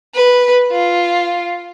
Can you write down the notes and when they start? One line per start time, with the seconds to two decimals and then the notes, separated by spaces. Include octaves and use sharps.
0.14 B4
0.72 F4